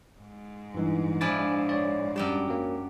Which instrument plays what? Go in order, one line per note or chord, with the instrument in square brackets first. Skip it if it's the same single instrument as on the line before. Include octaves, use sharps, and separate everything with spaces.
[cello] G#2
[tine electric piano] G2 E3 D#4
[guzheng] F3 D4 E4 [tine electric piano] G#5 D6 A6
[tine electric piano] C#5 D5
[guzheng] F#2 G4 A5 [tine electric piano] G3
[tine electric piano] F#3 A#3